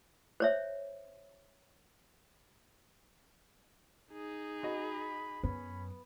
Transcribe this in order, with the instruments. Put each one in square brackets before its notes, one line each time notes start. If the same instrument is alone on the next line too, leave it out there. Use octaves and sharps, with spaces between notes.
[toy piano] C5 C#5 E5
[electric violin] D#4 G#4
[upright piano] F#4 D#5 [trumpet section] B5
[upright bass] F#2 [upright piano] B3 [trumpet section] C#4 B5